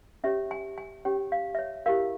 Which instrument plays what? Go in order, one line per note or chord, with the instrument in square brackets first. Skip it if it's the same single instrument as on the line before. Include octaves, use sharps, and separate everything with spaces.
[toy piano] C#4 G4 C#5 E5
G#5
G#5
C#4 G4 C#5 G5
F5
E5
C#5
E4 G4 A#4 F5